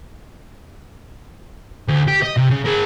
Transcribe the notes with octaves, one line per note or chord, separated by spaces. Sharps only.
D2
G4
D#5
C3
C#3
G#4 A#4